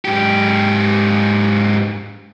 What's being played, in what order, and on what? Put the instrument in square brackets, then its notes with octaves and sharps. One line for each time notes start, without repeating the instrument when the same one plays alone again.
[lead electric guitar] G#2 G4